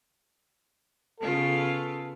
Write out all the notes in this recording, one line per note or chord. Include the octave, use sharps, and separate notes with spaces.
C#3 B3 F4 A4